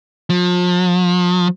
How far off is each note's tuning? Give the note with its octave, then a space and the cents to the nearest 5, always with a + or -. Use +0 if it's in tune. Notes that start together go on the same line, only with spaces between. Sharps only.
F3 +35